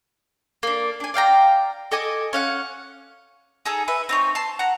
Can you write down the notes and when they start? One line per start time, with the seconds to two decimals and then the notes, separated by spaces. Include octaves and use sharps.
0.63 A#3 D4
1.00 D4 G#5
1.14 D5 F5 G5 A#5
1.92 A4 D#5 G#5 D6
2.33 C#4 F5 F#5
3.65 D#4 G#4 A4
3.88 B4 E5
4.09 C4 D#4 C#5
4.35 A5 C6
4.59 F#5 A#5